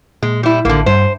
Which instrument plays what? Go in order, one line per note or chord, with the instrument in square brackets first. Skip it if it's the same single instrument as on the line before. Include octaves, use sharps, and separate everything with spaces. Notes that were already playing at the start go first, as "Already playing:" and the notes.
[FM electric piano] A#2 [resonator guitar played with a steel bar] G#3
[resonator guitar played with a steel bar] G3 E4
[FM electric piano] A1 [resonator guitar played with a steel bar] D3 A#3
[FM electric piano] G2 [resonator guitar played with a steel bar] C5